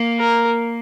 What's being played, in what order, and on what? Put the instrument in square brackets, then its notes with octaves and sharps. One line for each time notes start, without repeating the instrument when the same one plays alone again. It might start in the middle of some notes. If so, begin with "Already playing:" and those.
Already playing: [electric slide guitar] A#3
[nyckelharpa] A#4